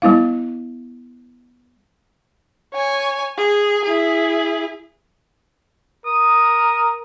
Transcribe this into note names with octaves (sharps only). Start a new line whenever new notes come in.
G3 B3 E4 F5
C#5 G#5
G#4
E4 G#4
A#4 D#6